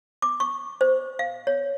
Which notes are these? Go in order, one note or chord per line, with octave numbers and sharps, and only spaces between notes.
D6
C#6
C5
F5
C#5